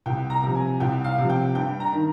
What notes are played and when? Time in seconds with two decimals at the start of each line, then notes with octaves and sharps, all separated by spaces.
0.06 C2 G5
0.30 A#5
0.43 C3 F3
0.55 G#5
0.80 C2 G5
1.04 F5
1.18 C3 F3
1.30 G5
1.55 G2 G5
1.80 A#5
1.92 D#3